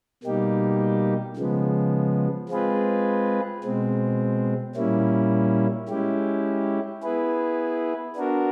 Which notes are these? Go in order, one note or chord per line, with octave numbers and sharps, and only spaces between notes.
B2 G3 A#3 D#4 G4
C#3 F3 G#3 B3
G#3 C4 F4 G#4 B4
B2 G#3 C4
A#2 G3 A#3 C#4 E4
G#3 C#4 E4 G4
B3 E4 G#4 B4
B3 D4 F#4 A#4